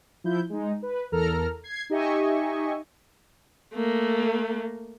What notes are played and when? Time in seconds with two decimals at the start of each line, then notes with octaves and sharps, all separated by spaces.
0.24 F3 E4 G6
0.49 G#3 D#4
0.82 B4
1.12 E2 A4 A#4 A#5 F6
1.64 G#6 C7
1.90 D#4 G4 D#5 E5 G#5 C#6
3.74 A3 A#3